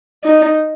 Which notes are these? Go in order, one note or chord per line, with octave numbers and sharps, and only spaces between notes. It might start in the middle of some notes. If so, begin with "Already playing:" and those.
D#4